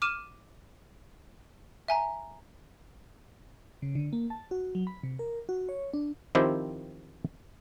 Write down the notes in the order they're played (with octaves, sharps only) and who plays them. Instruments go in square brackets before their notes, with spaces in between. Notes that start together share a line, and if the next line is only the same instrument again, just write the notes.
[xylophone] D6 F6 D#7 E7
E5 G#5 A#5
[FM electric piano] C#3
D3
A#3
A5
F#4
F#3
B5
C3
A#4
F#4
C#5
D4
[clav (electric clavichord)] D#3 F3 C4 E4 G4